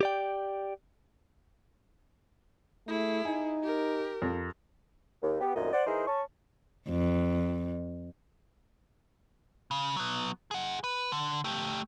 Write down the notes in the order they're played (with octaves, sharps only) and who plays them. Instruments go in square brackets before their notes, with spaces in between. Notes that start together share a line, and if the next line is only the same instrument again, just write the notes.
[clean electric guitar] G4 D5 G5
[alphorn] A3 [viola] E4 G#4
[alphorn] D#4 [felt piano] G#5
[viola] G4 A#4
[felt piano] F2
[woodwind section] D#2
B3 G4
C2 F#2 A#2 D#3 A3 D#5
C5 D5 F#5
E3 D#4 E4 G#4 A#4 C5
C#4 A5 C#6
[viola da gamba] F2
[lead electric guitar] C#3
F#3 B3
G#4 F#5
B4
D3
A3 G4